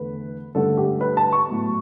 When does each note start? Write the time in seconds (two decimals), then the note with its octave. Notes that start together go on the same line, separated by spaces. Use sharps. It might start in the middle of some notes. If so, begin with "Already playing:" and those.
Already playing: E2 D3 A3 B4
0.55 G2 D3 A3 A4
0.78 G4
1.01 B4
1.17 A5
1.33 C#6
1.48 A2 F#3 B3